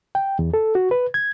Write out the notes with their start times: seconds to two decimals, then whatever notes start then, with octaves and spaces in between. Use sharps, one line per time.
0.15 G5
0.39 E2
0.54 A4
0.75 F#4
0.91 B4
1.14 G#6